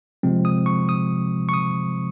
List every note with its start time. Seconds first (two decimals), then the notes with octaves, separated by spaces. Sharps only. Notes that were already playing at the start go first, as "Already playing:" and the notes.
0.23 C3 F3 G#3 C4
0.45 D#6
0.66 C#6
0.89 D#6
1.49 C#6
1.54 D#6